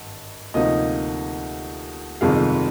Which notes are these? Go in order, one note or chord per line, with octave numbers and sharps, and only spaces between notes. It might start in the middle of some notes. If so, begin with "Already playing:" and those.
Already playing: G#1 G2
D2 C3 F3 A#3 D#4 D#5
G1 F2 C3 D#3 G#3 F5